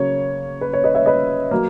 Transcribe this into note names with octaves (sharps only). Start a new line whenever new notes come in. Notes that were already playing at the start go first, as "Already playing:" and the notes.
Already playing: C#3 F#3 A#3 C#5
B4
C#5
B4 D#5
C#5 E5
B4 D#5
F#3 A#3